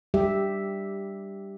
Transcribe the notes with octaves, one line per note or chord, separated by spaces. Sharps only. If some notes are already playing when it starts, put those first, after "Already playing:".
G3 G4 E5